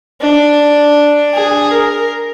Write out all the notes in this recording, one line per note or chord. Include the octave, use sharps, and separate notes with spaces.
D4
G#4
A#4